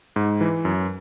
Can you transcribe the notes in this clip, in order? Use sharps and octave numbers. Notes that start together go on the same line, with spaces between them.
G#2
E3
F#2